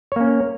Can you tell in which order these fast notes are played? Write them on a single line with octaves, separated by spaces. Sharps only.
C#5 A#3 C#4